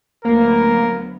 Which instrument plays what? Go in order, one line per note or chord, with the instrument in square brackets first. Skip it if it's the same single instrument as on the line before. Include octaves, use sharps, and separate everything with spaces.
[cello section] D2 F#3 B3 [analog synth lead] A#3 [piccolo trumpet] A#4